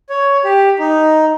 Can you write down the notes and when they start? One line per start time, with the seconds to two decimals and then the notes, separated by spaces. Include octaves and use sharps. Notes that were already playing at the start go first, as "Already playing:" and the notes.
0.09 C#5
0.45 G4
0.79 D#4